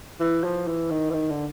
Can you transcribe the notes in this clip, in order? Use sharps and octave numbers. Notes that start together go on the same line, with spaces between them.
E3
F3
E3
D#3
E3
D#3
D3